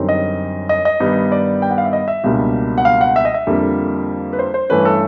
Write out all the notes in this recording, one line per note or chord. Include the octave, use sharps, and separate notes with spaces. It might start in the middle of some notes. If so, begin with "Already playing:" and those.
Already playing: F#2 D3 G3 C4 D#4
D#5
D#5
D#5
G2 D#3 G3 B3 D#4
D5
G5
F#5
F5
E5
D#5
E5
C#2 B2 G3 A#3 D4
F#5
F5
F#5
E5
D#5
E5
F2 D3 G3 A#3
B4
C5
C5
G2 E3 A3 C#4 B4
A4